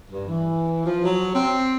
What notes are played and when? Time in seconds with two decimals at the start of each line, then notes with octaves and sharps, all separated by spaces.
0.11 G2
0.28 E3
0.85 F3
1.04 F#3
1.35 C4